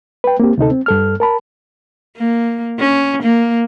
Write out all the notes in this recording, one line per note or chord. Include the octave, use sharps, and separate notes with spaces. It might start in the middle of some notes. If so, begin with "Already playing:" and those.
B4 G5
A#3 C4 G4
D2 C3 D#4 A4
C4
G2 A4 F6
A#4 A5 B5
A#3
C#4
A#3